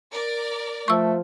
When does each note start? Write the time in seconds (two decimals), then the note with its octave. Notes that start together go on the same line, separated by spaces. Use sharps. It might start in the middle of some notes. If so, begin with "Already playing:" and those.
0.11 A#4 D5
0.88 F3 A3 C#6 E6